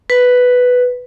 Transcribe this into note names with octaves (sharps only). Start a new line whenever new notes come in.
B4